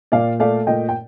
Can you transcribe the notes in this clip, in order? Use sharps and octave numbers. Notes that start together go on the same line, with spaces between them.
A#2 D5 F5
A3 D5 F5
A#2 D#5 G5
G5